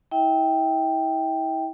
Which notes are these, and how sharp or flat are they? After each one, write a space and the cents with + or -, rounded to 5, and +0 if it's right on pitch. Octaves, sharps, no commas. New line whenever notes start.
E4 -30 E5 -35 G5 +0